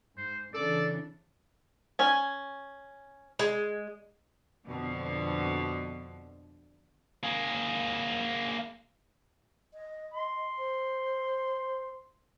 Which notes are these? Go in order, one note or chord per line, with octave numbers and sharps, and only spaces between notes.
G#2 C5
C#3 E3 D4 A4 D5
C#4 G#5
G#3
F2 B2 D3
A#3 G#4
D#5
C6
C5